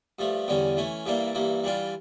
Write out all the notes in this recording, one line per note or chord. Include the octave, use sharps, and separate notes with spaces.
G2 F3 A3
E2 D3 G3 C#4
E3 A3 C#4
G2 E3 G3 A#3 D4
G2 E3 A#3
E3 G3 D4 F4